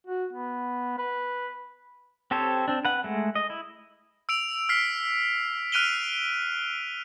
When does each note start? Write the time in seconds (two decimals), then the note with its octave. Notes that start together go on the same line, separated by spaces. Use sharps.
0.07 F#4
0.33 B3
0.98 B4
2.31 C4 G4 A4 C5 C#5
2.68 C4 D4
2.85 B4 F#5
3.04 G#3 A3
3.35 D#5
3.50 E4
4.29 E6 D7 F7
4.69 F6 B6 C7
5.72 F6 F#6 D7 D#7 F7 G7